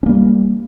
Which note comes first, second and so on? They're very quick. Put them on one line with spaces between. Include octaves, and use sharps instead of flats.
C#4 A#3 G3